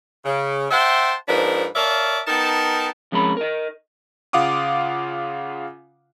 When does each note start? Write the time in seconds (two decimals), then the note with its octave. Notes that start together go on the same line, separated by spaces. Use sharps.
0.24 C#3
0.70 C5 E5 F#5 G5 A5 C6
1.28 G#2 F3 D4 A#4 B4
1.75 A#4 C#5 D5 E5 F5 A5
2.27 B3 D#4 A#4 G5 A5
3.12 F2 G#3 C#4 A#4 B5
3.37 A#4 D#5
4.33 C#3 F4 F5 F#5 D6 D#6